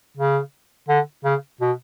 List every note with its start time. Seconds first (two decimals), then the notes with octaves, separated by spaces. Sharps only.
0.17 C#3
0.89 D3
1.24 C#3
1.61 B2